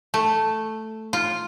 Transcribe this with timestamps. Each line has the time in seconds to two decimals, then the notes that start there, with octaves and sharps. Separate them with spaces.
0.14 A3
1.13 F4